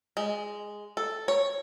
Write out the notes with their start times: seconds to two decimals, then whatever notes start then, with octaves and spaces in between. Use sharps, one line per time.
0.17 G#3
0.97 A4
1.28 C#5